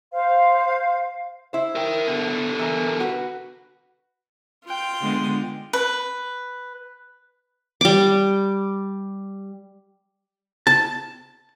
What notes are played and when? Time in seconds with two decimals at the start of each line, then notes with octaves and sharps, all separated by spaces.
0.12 C5 F5
1.53 E4 C5
1.75 A#4 G5
2.07 B2 D3
2.59 E3 A#4
3.00 F#4 B4
4.65 F4 G5
5.01 D3 G#3 B3
5.73 B4
7.81 G3 D6
10.67 A5